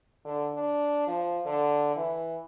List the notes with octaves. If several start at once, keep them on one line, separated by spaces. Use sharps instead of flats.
D3
D4
F3
D3
E3